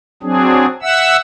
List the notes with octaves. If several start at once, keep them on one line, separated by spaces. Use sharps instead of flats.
F#3 C4 D4 G#4
E5 F#5 E6